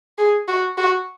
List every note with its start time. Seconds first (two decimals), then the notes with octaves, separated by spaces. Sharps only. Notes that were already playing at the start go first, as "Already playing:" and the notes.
0.18 G#4
0.48 F#4
0.78 F#4